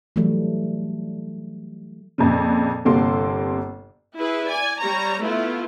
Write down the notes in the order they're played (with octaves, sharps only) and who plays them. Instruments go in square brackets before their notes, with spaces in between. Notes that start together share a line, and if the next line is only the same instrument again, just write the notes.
[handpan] E3 F#3 G3 A3
[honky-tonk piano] F2 A#2 C#3
G1 C3 A#3 A4 C6
[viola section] E4 G#4 B4
D5 G#5
G3 C#5 A#5
A3 B3 E4 F4